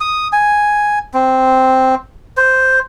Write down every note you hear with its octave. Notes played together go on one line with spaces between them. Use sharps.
D#6
G#5
C4
C5